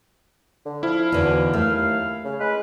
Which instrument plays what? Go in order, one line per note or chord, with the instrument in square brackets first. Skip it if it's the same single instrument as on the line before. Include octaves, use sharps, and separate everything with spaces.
[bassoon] D3
[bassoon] F3 [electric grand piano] E4 [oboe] F5
[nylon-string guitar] E2 D3 D#4 [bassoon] B2
[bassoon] D#2 [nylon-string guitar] A3 [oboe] F5
[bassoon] C#3
[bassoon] G#3 [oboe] B4